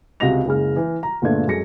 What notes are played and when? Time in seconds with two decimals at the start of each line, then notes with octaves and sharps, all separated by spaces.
0.20 C#2 C3 F#4 D#5 A#6 F7
0.46 F#1 C#3 G#3 F6
0.77 E3
1.03 A#5
1.22 G1 A#2 G#3 A3 D4 G#6
1.47 F#2 G#3 A4 A#6 C#7